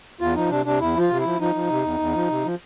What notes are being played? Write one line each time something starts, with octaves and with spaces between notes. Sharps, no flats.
E2 F4
F3 D#4
C3 D4
C3 D4
E2 E4
F3 F4
C3
F3 E4
F3 D#4
F3
C3
E2
E2
F3
C3
F3